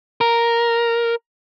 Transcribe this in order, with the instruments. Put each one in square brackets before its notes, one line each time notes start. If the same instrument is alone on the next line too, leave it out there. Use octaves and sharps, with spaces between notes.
[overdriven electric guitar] A#4